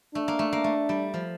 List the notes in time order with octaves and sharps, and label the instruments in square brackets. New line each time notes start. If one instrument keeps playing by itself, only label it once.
[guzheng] A3 [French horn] D4
[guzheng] A#3
A3
A#3
A3
G3
F3